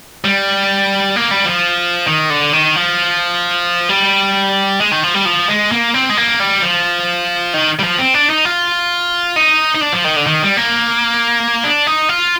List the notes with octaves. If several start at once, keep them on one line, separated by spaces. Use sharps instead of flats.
G3
A#3
G3
F3
D#3
D3
D#3
F3
G3
G#3
D#3
F3
G3
F3
G#3
A#3
C4
G#3
A#3
G3
F3
D#3
G3
F3
C4
D4
D#4
F4
D#4
D#4
D4
F3
D#3
D3
D#3
G3
A#3
D4
D#4
F4